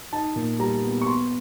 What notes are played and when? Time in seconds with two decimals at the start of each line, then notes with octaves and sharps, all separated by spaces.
0.13 D#4 A5
0.36 A#2
0.59 G3 A#5
0.84 B3
1.01 C#6
1.07 B3 C6